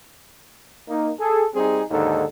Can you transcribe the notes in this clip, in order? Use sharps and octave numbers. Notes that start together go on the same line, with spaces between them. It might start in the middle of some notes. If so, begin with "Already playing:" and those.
A#3 D#4
G#4 A4
G3 C4 D#4 G#4
D#2 G#2 D3 D#4 A4